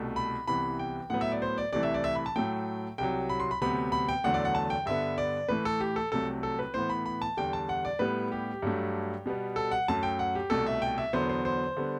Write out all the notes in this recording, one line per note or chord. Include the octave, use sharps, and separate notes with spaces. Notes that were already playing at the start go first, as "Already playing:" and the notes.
Already playing: C2 B2 A3
B5
C2 C3 E3 B3 B5
G5
A2 F#3 B3 F#5
E5
D5
C5
D5
C2 C3 E3 A3 D5
E5
D5
E5
B5
A5
A2 F#3 A3 G5
C2 C3 F#3 G5
B5
C6
B5
D2 C3 F#3 B3 B5
B5
G5
E2 D3 F#3 A3 F#5
D5
F#5
A5
G5
G2 D3 G3 B3 E5
D5
A2 E3 A3 B4
A4
G4
A4
C2 C3 F#3 A3 A4
A4
B4
A2 E3 B3 C5
B5
B5
A5
E2 D3 G3 G5
A5
F#5
D5
A2 G3 B3 B4
G4
G2 F#3 A3
B2 G3 B3
A4
F#5
F#2 F#3 A3 A5
G5
F#5
G4
C2 B2 A3 A4
E5
G5
E5
E2 D3 F#3 B3 C5
C5
C5
D3 G3 B3